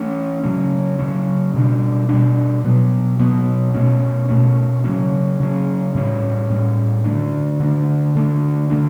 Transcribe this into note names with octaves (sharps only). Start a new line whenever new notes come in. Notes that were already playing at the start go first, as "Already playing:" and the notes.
Already playing: E3 A3 C#4
C#3 F#3 C#4
C#3 F#3 C#4
B2 G3 D4
B2 G3 D4
B2 F#3 B3
B2 F#3 B3
B2 A3 C#4
B2 A3 C#4
C#3 F#3 C#4
C#3 F#3 C#4
A2 G3 C#4
A2 G3 C#4
D3 A3 D4
D3 A3 D4
D3 A3 D4
D3 A3 D4